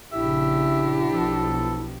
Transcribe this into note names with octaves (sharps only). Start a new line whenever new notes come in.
A#1 A#2 C#3 D4 E4 G4 E5
B1 B2 F3 A4